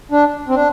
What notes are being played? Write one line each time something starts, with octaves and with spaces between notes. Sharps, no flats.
D4
C4
D4